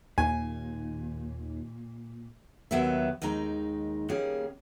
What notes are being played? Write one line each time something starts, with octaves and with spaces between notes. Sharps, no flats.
D#2 A#2 G#5
D#2 D#3 F#3 B3 D5 E5
D#2 D#3 G#3 D#4 A#5
D#3 G3 A#3 C#4 G#4